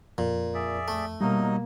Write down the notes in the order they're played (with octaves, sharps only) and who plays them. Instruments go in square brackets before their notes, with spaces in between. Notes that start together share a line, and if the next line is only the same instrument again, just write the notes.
[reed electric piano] F2 [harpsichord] A#2
[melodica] G#4 D5 E5
[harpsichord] A3
[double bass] B2 A#3 [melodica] F#3 D#4 D#5 [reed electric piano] G3